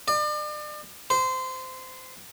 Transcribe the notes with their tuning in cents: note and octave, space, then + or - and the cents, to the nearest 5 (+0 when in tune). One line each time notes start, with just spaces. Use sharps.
D5 +40
C5 -20